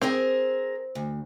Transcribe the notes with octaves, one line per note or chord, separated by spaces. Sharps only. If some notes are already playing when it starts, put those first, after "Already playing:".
C4 G#4 A#4 C5
D2